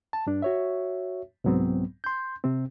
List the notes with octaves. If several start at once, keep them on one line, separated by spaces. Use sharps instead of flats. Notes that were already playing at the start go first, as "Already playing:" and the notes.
A5
G2 D4
F#4 C#5 E5
C2 G#2 F#3 B3 C4
C6 G6
C3 C4